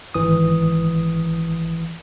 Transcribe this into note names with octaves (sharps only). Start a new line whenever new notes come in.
G#1 E3 D#6